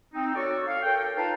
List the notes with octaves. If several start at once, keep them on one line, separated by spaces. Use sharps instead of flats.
C4 D#4
F#4 A4 C#5 D5 C#6
F5
A4 A#4 C#5 G5
D#4 F4 B4 F5 A5